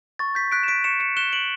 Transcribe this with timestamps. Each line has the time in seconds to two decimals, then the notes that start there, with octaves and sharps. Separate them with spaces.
0.19 C#6 A6
0.35 G6 B6
0.52 F#6 B6 D7
0.63 E7
0.68 B6 D7
0.84 C#6 C#7 E7
1.00 C#7 E7
1.17 F#6 E7 G7
1.33 D7 F#7